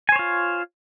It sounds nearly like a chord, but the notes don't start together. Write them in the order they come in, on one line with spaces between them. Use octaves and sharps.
G#5 C5 C#5 F4